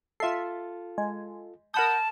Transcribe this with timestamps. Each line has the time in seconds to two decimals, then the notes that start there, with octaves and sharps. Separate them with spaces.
0.20 F4 A4 E5 C7
0.98 G#3
1.74 A#4 F#5 A5 B5 D#6 G6